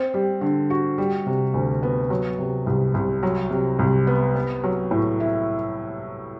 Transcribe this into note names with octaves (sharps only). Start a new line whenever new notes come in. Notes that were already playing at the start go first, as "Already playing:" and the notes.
Already playing: C4
G3
D3
F#4
G3
C3
D2
B3
F#3
C3
C2
C2
F#3
C3
C2
B3
B3
F#3
A2
E4